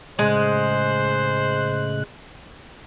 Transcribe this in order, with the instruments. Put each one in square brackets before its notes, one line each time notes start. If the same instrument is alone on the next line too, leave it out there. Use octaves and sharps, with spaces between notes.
[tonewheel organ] A2 C#3 F#6 [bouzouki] G#3 [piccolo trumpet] C5